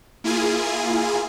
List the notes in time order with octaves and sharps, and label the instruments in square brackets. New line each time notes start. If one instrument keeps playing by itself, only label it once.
[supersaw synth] A#3 E4 F4 G#4 G#5